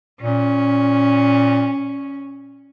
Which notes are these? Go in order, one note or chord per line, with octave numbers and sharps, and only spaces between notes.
A#2 C#4